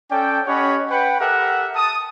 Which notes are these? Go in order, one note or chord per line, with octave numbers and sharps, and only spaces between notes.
C#4 A4 D5 G5
C#4 G4 C#5 D#5 F#5 B5
B4 F#5 G5
G4 A4 A#4 E5 F#5
A5 D#6